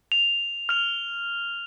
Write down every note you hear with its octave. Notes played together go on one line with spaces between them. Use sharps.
F7
F6 F7